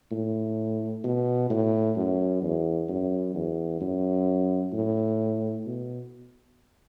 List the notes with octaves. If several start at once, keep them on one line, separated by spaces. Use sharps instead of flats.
A2
B2
A2
F#2
E2
F#2
E2
F#2
A2
B2